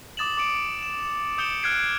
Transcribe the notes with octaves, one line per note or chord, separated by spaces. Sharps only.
D6 D#6 A6 E7 F#7
D6 D#6 C#7 D7 F#7
E7
D#6 G6 C#7 D7 E7 G7
F6 F#6 G#6 C7 D7